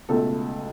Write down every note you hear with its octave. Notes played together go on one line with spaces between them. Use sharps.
C#2 B2 A3 A4